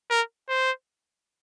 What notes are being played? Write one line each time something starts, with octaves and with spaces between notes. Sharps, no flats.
A#4
C5